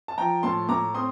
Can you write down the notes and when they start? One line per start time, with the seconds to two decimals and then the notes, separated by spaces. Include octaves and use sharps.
0.08 A5
0.18 F3 G5 A#5
0.43 A2 A5 C6
0.69 A2 A#5 D6
0.94 C4 C6 D#6